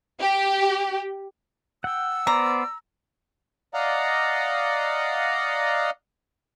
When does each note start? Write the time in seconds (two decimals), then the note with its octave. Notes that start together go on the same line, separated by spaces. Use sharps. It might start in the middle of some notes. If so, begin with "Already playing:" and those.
0.21 G4
1.84 F#5 G5 E6
2.27 B3 C5 D5 A#5
3.74 D5 D#5 F5 F#5 A#5